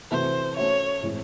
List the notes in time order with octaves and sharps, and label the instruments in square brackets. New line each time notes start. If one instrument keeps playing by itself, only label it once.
[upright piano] C3 E3 A3 C4 F#4 [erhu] C5
[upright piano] A3 C#4 F#4 C5 E5 [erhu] C#5
[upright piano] A2 E3 G#3 C4